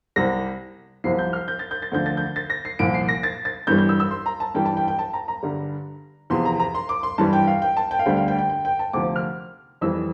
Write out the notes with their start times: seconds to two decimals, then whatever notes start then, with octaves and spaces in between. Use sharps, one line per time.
0.16 C2 C3 G3 A#6
1.04 C2 C3 F3 C7
1.19 G6
1.33 F6
1.48 G6
1.59 A6
1.71 G6
1.82 A6
1.92 D2 D3 F3 G6
2.06 A6
2.17 G6
2.36 A6
2.50 A#6
2.65 C7
2.79 C2 A#2 F3 D7
2.94 C7
3.09 A#6
3.23 A6
3.45 A6
3.67 G2 E3 G3 G6
3.78 G6
3.89 E6
4.00 E6
4.11 C6
4.26 A#5
4.40 A5
4.55 G2 E3 G3 G5
4.65 A5
4.77 G5
4.88 G5
4.99 A5
5.14 A#5
5.28 A#5
5.43 G2 D3 G3
6.30 E2 C3 F3 C6
6.45 A#5
6.60 A#5
6.75 C6
6.89 D6
7.03 C6
7.18 G2 E3 G3 A5
7.33 G5
7.47 F5
7.62 G5
7.77 A5
7.91 G5
7.99 F5
8.06 D2 D3 G3 G5
8.17 F5
8.28 G5
8.39 G5
8.50 G5
8.65 G5
8.79 A5
8.93 D2 C3 F3 D6
9.16 F6
9.81 F2 E3 G3 E6